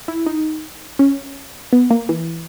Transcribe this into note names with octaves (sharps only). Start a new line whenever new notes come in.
E4
D#4
C#4
B3
A#3
E3